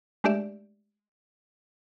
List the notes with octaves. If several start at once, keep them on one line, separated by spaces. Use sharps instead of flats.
G#3 A3 D4 G4 D5 E5